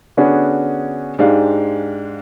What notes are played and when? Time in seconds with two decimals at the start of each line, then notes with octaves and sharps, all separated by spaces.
0.17 D3 B3 C#4 D4 F#4 G#4
1.18 G#2 G#3 D4 G4 F5